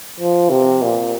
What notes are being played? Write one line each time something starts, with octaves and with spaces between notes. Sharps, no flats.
F3
C3
A#2